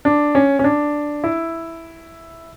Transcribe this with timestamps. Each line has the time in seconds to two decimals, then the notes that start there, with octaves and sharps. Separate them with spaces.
0.05 D4
0.35 C#4
0.59 C#4
0.64 D4
1.24 E4